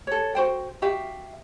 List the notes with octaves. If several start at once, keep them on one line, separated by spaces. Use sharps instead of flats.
A4 C#5
F#4 C5 G5
F#4 G4 E5 F5